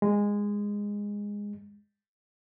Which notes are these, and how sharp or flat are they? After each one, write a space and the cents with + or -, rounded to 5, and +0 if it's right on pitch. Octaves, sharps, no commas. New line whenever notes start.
G#3 -15